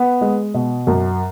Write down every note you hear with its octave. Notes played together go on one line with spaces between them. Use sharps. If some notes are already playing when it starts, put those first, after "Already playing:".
Already playing: B3
G#3
B2
F#2